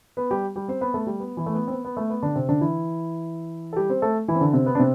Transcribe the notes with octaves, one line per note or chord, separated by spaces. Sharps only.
B3 B4
G3 G4
G3 G4
C4 C5
B3 B4
A3 A4
G3 G4
B3
E3 E4
A3
B3
C4
B3
B3
A3
B3
D3 D4
C3 C4
D3 D4
E3 E4
A4
G3 G4
C4 C5
A3 A4
E3 E4
C4
D3 D4
C3 C4
B3
D4
C3 C4